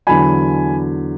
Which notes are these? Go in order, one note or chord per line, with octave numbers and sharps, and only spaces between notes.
E2 D3 F#3 G#5 B5